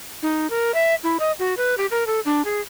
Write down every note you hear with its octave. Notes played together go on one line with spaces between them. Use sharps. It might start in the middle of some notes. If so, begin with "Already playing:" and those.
D#4
A#4
E5
E4
D#5
F#4
B4
G4
A#4
A4
D4
G#4